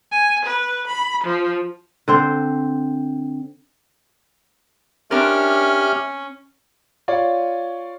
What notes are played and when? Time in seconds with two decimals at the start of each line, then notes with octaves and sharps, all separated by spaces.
0.11 G#5
0.45 B4
0.87 B5
1.24 F3
2.08 D3 C4 C5
5.11 C#4 D4 G4 A#4 E5 F6
7.08 F4 C#5 D5